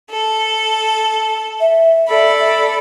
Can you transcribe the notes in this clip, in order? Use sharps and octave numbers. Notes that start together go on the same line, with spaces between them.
A4
E5
A4 D5 B5